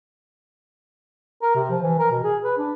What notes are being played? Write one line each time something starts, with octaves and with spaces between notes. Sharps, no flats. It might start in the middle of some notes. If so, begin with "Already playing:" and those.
A#4
C3
F3
E3
A#4
B2
G#4
B4
D4